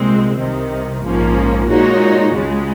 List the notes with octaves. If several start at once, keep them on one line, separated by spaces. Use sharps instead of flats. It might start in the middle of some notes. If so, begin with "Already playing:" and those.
Already playing: C2 A#2 G#3 C4
C2 C3 D#3
A#1 G#2 F3 A#3 C#4
A#2 G#3 D#4 F#4 C#5
C#2 C#3 G#3